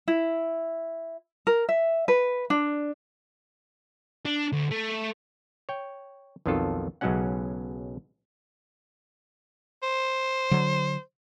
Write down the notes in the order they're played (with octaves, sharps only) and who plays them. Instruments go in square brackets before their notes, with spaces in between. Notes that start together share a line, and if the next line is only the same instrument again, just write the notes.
[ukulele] E4
A#4
E5
B4
D4
[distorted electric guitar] D4
D2
A3
[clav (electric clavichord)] C#5 G5
B1 F2 D#3 F#3 F4 A4
B1 C#3 F#3 G#3 C#4 F#5
[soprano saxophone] C5
[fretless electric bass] D3 F#3